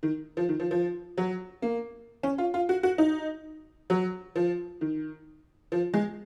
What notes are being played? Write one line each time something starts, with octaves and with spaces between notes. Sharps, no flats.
D#3
F3
D#3
F3
F3
F#3
A#3
C#4
F4
F4
F#4
F#4
D#4
F#3
F3
D#3
F3
G#3